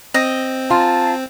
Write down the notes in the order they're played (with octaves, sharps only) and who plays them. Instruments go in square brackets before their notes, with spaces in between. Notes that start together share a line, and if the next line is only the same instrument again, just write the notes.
[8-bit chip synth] C4 [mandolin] D#5
[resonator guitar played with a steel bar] F4 [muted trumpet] A5